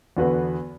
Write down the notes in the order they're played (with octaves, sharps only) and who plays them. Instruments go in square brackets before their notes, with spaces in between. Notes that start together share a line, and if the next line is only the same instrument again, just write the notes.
[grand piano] E2 D3 B3 F#4 B4